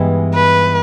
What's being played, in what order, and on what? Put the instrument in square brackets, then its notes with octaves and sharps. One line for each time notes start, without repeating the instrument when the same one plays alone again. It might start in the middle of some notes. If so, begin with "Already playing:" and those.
Already playing: [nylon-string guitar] G2 E3 G#3 B3 D#4
[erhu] B4